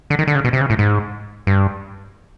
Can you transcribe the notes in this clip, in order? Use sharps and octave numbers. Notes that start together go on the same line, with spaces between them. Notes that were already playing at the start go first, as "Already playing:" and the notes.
D3
D#3
D3
C#3
B2
C3
C#3
A2
G#2
G2